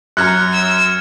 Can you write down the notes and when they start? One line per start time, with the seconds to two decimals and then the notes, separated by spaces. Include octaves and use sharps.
0.17 F#2 A#5 F6 F#6 G#6 C#7
0.53 E6